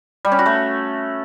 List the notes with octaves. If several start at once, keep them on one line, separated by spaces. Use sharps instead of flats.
G3
C#4
F#4
A3